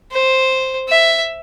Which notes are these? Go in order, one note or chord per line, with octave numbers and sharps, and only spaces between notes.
C5
E5